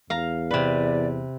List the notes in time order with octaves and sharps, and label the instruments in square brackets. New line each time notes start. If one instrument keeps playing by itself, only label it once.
[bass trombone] E2 [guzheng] F5 A#5
[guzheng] C3 B4 [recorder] D5